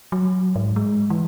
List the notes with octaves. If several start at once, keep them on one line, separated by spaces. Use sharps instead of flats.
F#3
G#2
G#3
E3